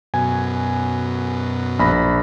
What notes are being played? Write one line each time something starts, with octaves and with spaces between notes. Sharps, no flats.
F#2 B2 G#5
A#1 B5 A#6